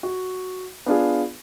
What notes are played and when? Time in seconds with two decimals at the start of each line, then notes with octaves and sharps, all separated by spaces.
0.03 F#4
0.86 B3 D4 F4 G#4